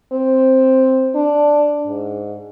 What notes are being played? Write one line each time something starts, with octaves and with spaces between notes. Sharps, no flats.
C4
D4
G#2